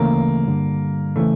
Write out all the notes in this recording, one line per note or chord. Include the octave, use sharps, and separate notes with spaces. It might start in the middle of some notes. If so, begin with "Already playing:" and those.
Already playing: D2 C#3 E3 A3 A#3
G2 D3 G3
C#3 E3 A3